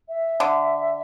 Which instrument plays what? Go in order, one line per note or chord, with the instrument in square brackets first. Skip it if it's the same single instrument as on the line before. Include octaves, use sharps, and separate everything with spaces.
[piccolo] E5
[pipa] D3